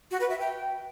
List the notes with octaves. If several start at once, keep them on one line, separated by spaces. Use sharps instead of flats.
F#4
B4
E5
G5